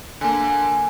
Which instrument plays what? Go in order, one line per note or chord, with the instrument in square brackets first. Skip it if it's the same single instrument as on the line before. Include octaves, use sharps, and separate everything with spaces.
[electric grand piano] D3 A#3 [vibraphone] G#5